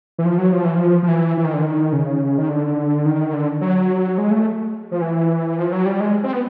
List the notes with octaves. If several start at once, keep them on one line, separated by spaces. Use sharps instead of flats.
E3
F3
F#3
F3
E3
F3
F3
E3
E3
D#3
D3
D#3
C#3
D#3
D3
D#3
D3
F#3
G#3
A3
F3
E3
F3
F#3
G3
G#3
C4
B3